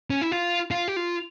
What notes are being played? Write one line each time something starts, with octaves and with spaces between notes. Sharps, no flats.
C#4
E4
F4
F4
G4
F4